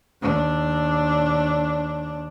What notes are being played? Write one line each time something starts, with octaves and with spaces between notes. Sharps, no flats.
D#2 D4